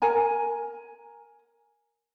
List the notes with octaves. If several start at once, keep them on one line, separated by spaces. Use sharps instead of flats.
A#4 G#5 A#5